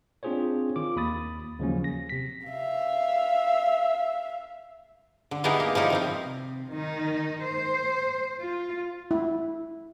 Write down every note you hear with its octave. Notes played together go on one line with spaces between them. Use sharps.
C4 D4 F4 G#4 C5 C#5
D#3 F4 D6
D#2 B5 D#6 A6
D#2 C#3 F3 F#3 C#4
A#6
C3 B6
E5 F5
D3
B3 D#4 E4 G4 G#4 A#4
A#3
F3 G3 D#4 E4
D#3 F3 C4
C3
D#3 D#4
C5
F4
E4